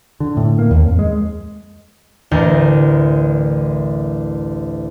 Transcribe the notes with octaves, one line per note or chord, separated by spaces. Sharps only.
D3
A2
A#3
D#2
F2
G#3
A1 D2 A#4 G6